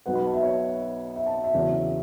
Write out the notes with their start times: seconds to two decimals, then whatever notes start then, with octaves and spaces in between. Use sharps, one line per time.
0.06 B1 B2 B3 F#5
0.15 B5
0.24 A5
0.33 E5
0.43 C#5
1.16 E5
1.26 A5
1.44 E5
1.54 E2 C#3 F#3 C#4